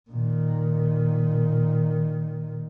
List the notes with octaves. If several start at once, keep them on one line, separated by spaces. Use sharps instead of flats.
A#2 D#3